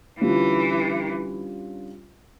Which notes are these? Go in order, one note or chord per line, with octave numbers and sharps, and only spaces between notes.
D3 E3 G3 C#4 F4